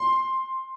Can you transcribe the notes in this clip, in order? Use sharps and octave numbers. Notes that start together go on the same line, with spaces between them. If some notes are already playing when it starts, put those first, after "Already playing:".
Already playing: C6